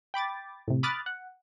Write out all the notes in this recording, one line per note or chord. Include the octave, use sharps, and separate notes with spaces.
G5 B5 D6 A6
A2 C3
B5 D6 D#6 F6 F#6 A6
F#5